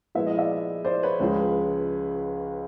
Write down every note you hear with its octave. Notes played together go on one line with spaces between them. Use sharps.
A#2 F3 G#3 B3 E4 E5
D#5
D5 E5
C5 D5
B4 C#5
C#2 C#3 F3 G#3